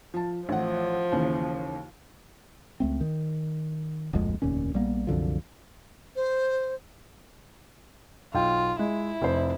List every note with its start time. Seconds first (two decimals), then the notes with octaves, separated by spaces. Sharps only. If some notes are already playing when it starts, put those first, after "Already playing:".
0.14 F3 A5
0.49 A1 F3 F#5
1.12 D#2 C#3 E3
2.80 C#2 A3 C4
3.01 D#3
4.13 D1 A#1 F2 G#3
4.42 F1 D#2 A#2 C#4
4.74 A#1 G3 A#3 B3
5.07 C2 F#2 D3 F3
6.16 C5
8.34 B1 F4 F5 G5
8.79 G#3 E4
9.22 F1 C5